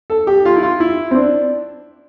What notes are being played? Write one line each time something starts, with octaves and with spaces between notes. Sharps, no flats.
A4
G4
F4
E4
F4
E4
C4
D4